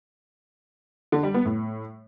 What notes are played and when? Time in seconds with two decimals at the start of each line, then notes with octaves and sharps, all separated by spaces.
1.12 D3
1.23 G3
1.34 B3
1.45 A2